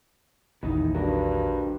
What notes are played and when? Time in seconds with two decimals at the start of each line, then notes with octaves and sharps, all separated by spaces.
0.63 A#1 E2 D#3 E3 A#3 D#4
0.95 G2 D3 F#4 A#4